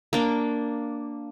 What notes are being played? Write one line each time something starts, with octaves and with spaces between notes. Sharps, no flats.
A#3 D4